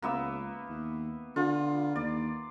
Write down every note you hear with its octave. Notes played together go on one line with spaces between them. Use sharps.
C#2 A#3 B3 E5
D#2
D3 F4
D#2 D5